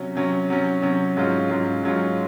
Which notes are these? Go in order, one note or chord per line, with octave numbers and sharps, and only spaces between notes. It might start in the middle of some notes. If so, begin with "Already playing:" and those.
Already playing: C3 F#3 C#4
C3 F#3 C#4
C3 F#3 C#4
C3 F#3 C#4
G#2 F#3 C#4 F4
G#2 F#3 C#4 F4
G#2 F#3 C#4 F4